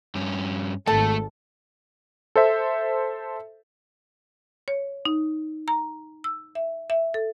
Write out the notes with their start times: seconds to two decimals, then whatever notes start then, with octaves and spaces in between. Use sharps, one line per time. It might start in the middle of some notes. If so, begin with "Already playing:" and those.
0.15 G2 C#4
0.87 G#1 A3 A4 A5
2.36 A4 C5 E5
4.68 C#5
5.05 D#4
5.68 A#5
6.24 E6
6.55 E5
6.90 E5
7.14 A4